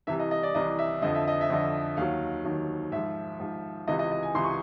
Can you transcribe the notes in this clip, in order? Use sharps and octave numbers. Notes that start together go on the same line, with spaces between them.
C2 C3 E3 E5
D#5
D#5
D5
C2 C3 E3 D#5
E5
F2 D3 F3 D#5
E5
D#5
E5
F2 D3 F3 D#5
D#2 D#3 F#3 F5
D#2 D#3 F#3
G#2 F3 E5
G#2 F3
C#2 C3 E3 D#5
D#5
D#5
G#5
C#2 C3 E3 C6
C#6